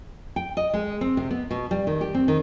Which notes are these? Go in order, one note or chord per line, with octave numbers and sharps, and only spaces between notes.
G5
D#5
G#3
C4
C3
B3
B2
G3
D#3
G4
C4
D#3